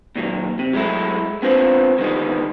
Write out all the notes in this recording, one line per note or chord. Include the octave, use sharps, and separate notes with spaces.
A#2 D#3 F#3
C3
F#3 G#3 A3 E4
B3 C4 D4 F4 B4 C5
D3 D#3 G3 B3 D#4